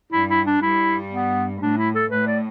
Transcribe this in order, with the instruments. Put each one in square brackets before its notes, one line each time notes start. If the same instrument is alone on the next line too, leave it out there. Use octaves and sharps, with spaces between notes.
[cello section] G2 G3 [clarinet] E4
[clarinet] E4
D4
[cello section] G2 G3 [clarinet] E4
[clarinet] B3
[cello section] A2 [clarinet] D4
[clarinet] E4
A4
[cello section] A2 [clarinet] B4
[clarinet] D5